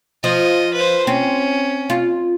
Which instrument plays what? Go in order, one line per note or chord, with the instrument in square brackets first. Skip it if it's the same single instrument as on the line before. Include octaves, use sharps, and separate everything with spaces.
[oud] F3 [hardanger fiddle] D#5
[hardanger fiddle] B4 C5
[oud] C4 [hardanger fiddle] C#4
[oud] F4